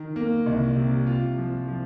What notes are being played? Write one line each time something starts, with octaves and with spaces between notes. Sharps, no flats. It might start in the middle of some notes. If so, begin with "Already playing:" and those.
Already playing: D#3
A#3
C2
C3
F4
F3
F3